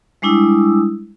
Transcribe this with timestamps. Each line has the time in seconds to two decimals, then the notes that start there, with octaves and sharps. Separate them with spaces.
0.22 G3 G#3 D4 E4 D#6 E6